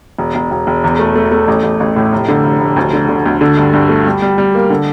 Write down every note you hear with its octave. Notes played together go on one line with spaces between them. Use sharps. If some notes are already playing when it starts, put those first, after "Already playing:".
E1
E1
E1
E1
E2
A3
A3
A3
A1
A1
A1
A2
F1
D3
F1
F1
D2
D3
D3
D2
D3
G2
G2
A3
G3
G3
G3
A#3
D3